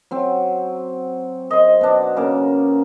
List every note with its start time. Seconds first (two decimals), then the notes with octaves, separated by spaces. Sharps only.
0.11 F#3 C4
1.51 C5 D#5
1.81 B2 D4
2.17 C#3 A#3 D6